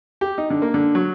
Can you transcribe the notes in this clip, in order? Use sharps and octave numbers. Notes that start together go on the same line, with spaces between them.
G4
D#4
D3
A#3
D3
F#3